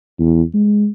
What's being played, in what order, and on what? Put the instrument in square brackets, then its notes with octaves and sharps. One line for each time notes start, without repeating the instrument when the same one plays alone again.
[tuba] E2
G#3